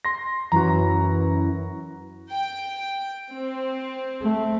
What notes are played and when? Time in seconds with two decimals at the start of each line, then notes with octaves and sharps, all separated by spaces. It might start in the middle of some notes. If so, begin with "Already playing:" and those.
0.05 C6 A#6
0.52 F#2 E3 F#4 A#5
2.30 G5
3.32 C4
4.22 A3